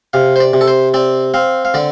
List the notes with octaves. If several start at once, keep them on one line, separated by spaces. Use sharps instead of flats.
C3 F5
C5
D5
C3
A4
C5
C4 D5
C4 F5
F5
D3 D5